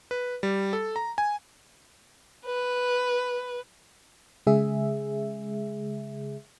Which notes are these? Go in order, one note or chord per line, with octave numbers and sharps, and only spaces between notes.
B4
G3
A4
A#5
G#5
B4
C#3 G#3 G#4 E5